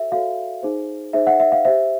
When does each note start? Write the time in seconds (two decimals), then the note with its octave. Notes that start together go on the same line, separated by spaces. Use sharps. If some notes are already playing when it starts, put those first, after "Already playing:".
Already playing: F#4 A4 C#5 E5
0.12 F#4 A4 C#5 F5
0.63 D#4 G#4 C5
1.13 D#4 G#4 C5 E5
1.27 E5 F#5
1.40 E5
1.52 F5
1.65 G4 C5 E5